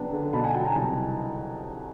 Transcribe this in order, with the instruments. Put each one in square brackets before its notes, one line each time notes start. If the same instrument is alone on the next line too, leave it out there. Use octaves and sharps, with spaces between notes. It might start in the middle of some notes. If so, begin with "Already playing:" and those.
Already playing: [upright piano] C#3 F#3 B3 D4 G5
D3
B2 A5 B5
F#5 G#5
F#3 G5 A5
G#5 A#5
C2 G5 A5